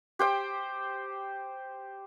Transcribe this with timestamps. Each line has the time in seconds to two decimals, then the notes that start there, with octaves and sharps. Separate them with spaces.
0.19 G4 C5 G5